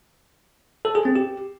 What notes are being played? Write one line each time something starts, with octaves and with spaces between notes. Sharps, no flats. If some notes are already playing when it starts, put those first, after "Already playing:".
A4
G#4
C4
G4